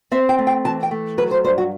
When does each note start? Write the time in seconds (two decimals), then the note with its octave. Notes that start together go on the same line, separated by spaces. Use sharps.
0.12 C4 E5
0.29 G5
0.39 A3
0.47 G5
0.65 E3 A5
0.83 G5
0.91 A3
1.18 F#3 B4
1.31 C5
1.44 G2 C5
1.58 F#4